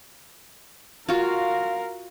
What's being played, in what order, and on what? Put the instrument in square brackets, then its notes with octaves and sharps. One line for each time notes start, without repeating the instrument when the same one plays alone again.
[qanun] F4 F#4 [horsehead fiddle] A#4 F5